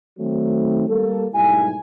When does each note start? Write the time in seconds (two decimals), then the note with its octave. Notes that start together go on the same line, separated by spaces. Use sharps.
0.19 D#3 F#3 A3 C4
0.88 G3 A#3 A4
1.34 B1 G#2 G3 A3 E4 G#5